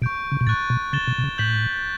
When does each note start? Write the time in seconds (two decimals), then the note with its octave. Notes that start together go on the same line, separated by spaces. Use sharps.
0.02 B2 C#6 G6 D7
0.32 C#3
0.41 B2
0.47 A2 C#6 F#6 A6
0.70 B2
0.93 C#3 A6 E7 G7
1.08 B2
1.18 B2
1.24 C#3
1.38 A2 G6 B6 F#7